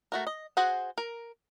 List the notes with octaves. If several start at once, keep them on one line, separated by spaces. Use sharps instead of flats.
A3 F#4 A#4
D#5
F#4 G#4 C5 F#5
A#4